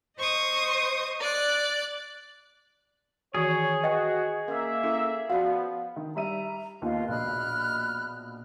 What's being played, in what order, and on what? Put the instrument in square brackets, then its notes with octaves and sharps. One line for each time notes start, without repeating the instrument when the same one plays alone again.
[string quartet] C5 D#5 C#6 D#6
D5 F#6
[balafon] D#3 E3 F#4 [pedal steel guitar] G#4 [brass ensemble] C#5
[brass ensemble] F#4 [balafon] B4 [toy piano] D#5 G5
[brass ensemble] A#3 E5 [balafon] C#4 A#4
[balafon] C#4 E4 A4
[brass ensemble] F3 B3 [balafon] F#4 D5 [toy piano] F5
[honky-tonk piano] D#3
[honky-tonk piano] G3 E5 D#7 [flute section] A#5
[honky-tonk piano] D#2 B3 [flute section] F4 D#5
[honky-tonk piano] A#1 B2 D#5 [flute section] B5 F6 F#6